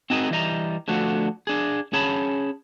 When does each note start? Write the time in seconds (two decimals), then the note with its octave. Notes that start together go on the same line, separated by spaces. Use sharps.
0.10 C4 D#4 F#4 G#4 A#4 D#5
0.30 E3 G3 D#5 A#5
0.88 D3 F3 A3 F#4
1.47 D4 G#4
1.93 C#4 G#4 C#5 A5 B5